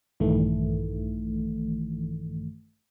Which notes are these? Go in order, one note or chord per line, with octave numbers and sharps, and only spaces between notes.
A#1 G2 D#3 E3 A3